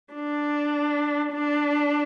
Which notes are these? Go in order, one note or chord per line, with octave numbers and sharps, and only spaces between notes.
D4
D4